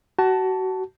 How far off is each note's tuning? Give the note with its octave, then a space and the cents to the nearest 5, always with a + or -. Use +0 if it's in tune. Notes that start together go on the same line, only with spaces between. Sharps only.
F#4 +25 A5 +0